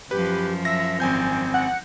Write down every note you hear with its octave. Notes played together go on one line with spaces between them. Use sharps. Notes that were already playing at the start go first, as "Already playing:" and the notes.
F#2 F3 G4 B4
E5 A#6
G#1 C4 G#5 G6
F#5